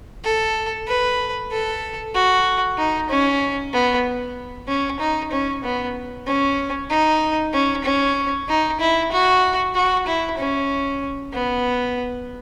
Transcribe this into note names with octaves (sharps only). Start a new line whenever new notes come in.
A4
B4
A4
F#4
D#4
C#4
B3
C#4
D#4
C#4
B3
C#4
D#4
C#4
C#4
D#4
E4
F#4
F#4
E4
C#4
B3